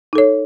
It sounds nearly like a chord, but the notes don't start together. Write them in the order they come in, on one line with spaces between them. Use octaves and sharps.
D#4 A4 C#5